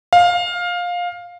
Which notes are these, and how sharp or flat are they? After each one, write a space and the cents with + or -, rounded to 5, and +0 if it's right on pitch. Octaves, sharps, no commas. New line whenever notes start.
F5 +15